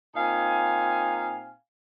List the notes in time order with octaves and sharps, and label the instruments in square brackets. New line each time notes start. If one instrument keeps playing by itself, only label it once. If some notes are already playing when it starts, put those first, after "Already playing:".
[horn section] A#2 C4 D#4 F5 G#5